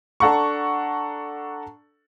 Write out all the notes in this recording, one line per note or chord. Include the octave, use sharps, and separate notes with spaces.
D4 A4 F#5 A#5 C#6